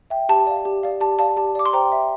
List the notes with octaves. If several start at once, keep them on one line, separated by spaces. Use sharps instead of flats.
E5 G5
G4 A5
D5 F5
G4
D5 F5
G4 A5
D5 F5 A5
G4 A5
D5 F5 D6
C6
C5 G5 A#5
E5 G5